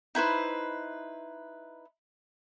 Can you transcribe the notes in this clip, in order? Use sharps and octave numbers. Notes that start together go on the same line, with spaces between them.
D#4 E4 B4 C5